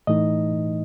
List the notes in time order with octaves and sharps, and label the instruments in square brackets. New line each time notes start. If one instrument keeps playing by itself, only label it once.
[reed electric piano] A2 E3 A3 D#4 D#5